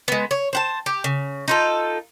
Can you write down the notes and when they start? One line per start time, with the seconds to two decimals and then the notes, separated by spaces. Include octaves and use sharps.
0.08 G#3 B3
0.31 C#5
0.53 C5 F#5 A5
0.86 G4
1.04 C#3
1.48 D#4 F4 A4